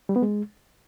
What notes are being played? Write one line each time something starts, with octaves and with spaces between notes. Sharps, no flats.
G3
B3
G#3